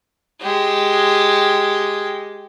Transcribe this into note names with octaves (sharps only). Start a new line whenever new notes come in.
G#3 G4